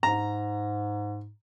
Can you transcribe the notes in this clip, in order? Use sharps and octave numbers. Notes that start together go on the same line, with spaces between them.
G#2 A#5